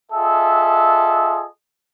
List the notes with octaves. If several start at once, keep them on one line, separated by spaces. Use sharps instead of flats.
F4 G#4 A4 D#5 E5